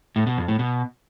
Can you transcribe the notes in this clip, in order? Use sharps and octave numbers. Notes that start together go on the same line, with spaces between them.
A2
B2
F2
A2
B2